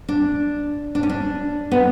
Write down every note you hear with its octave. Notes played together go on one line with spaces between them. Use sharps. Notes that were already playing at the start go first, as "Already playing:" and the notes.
D4
D4
C#4
D4
B3